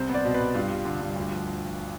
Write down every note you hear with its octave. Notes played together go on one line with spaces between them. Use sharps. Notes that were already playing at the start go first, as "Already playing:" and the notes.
Already playing: C2 C4 C5
B3
D5
B2
B4
C2
G2 F4
G3
D3
G2
D2
F3